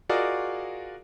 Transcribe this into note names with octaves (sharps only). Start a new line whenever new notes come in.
F4 F#4 G#4 A#4 D5 D#5